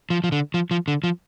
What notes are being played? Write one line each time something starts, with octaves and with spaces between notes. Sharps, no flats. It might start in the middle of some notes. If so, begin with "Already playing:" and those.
F3
F3
D3
F3
F3
D3
F3